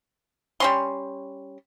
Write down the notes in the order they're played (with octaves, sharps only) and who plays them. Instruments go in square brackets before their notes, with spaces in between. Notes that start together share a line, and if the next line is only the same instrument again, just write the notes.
[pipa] G3 C#4 C6